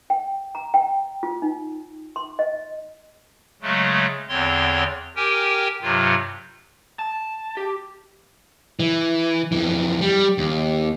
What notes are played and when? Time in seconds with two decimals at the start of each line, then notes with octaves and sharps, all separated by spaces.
0.10 G5
0.55 A#5
0.74 G5
1.23 F4
1.42 D#4
2.16 C6
2.39 D#5
3.62 C#3 F#3 G#3 A3
4.29 E2 D3 C4 C#5 C6
5.16 G4 A#4 G5 G#5
5.82 G2 C3 F#3 F4
6.99 A5
7.57 G4
8.80 E3
9.52 F2 E3
10.01 G3
10.38 D#2